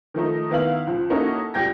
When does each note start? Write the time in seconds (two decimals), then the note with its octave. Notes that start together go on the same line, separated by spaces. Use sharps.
0.14 D#3 F3 A3 D#4
0.50 D#3 B3 E4 F5 F#7
0.87 C#2 F3
1.10 A#3 C#4 D#4 E4 F#4 A4
1.54 C#2 G3 G4 G5 G#6 A#6